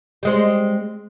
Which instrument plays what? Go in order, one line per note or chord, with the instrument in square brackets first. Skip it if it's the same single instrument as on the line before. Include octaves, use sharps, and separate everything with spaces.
[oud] G3 G#3 C4